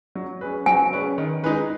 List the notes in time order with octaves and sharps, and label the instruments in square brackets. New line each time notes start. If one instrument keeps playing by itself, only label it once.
[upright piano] F#3
C#4 G#4 B4
[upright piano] F#3 [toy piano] G#5
[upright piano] C#4 G#4 B4
D#3
G#3 D#4 G#4 B4